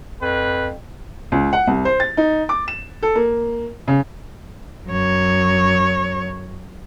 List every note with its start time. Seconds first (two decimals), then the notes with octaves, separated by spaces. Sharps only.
0.22 F2 B4
1.32 C#2
1.53 F#5
1.67 C2
1.85 C5
2.00 A6
2.17 D#4
2.49 D6
2.68 E7
3.03 A4
3.15 A#3
3.88 C#3
4.88 F#2 C#5